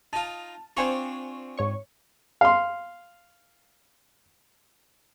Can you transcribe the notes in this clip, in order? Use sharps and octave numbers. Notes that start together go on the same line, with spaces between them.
D#4 F4 A5
C4 D4 F4 C5 G#5 C#6
G#2 C#5 C#6
F5 C6